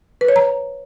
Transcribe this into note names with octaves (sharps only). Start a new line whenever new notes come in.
B4
C#5
A#5